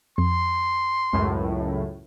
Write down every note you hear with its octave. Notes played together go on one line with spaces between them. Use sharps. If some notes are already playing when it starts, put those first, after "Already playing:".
F2 C6
C#2 F#2 A2